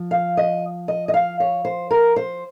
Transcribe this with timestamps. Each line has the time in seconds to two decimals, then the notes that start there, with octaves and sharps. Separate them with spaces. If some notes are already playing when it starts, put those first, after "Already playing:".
Already playing: F3
0.11 F5
0.37 D#5
0.88 D#5
1.08 D#5
1.14 F5
1.40 C#5
1.65 C5
1.91 A#4
2.16 C5